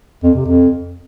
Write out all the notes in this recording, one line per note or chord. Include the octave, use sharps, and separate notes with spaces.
F2
C3
F2